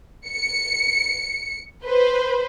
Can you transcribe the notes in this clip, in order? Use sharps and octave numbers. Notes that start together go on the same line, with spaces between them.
C#7
B4 C5